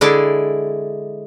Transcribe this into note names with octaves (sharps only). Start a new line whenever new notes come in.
D3 G#3 E4 G#4 D5